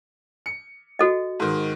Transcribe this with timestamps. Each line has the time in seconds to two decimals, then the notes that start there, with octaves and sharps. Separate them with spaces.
0.46 C#7
0.99 F#4 A4 D#5
1.40 G#2 D#3